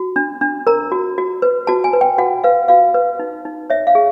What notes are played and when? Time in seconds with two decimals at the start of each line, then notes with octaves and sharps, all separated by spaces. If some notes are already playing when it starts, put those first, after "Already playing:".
Already playing: F#4
0.16 D4
0.41 D4
0.67 A#4 A#5
0.92 F#4
1.18 F#4
1.42 B4
1.67 F#4 A5
1.84 G#5
1.93 B4
2.01 G5
2.18 F#4 F#5
2.44 B4 F5
2.68 F#4 F5
2.94 B4
3.19 D#4
3.45 D#4
3.70 C#5 E5
3.87 F5
3.95 G#4